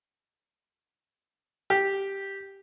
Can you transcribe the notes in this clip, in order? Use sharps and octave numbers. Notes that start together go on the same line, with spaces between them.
G4